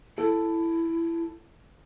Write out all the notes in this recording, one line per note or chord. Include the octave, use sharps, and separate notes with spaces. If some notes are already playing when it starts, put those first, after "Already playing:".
E4 A4